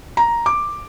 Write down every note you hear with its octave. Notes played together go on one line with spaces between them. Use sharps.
A#5
D6